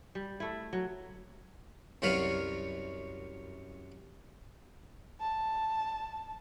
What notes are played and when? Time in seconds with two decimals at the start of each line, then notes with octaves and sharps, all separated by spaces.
0.15 G3
0.40 A3 E4
0.73 F#3
2.02 C2 F#2 F#3 B4 C#5 F5
5.21 A5